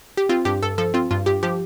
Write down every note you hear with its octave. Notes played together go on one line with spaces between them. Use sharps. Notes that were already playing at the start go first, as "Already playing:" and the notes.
G4
C4 F4
G2 G4
G2 A4
F3 A4
C4 F4
G2 F4
G2 G4
F3 G4